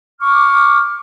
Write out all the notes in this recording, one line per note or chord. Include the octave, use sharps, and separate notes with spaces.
C#6 D6 F6